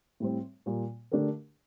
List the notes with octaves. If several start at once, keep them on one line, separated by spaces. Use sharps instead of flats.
A2 G3 C4
A#2 G3 A#3
D3 A3 D4 G4 A#4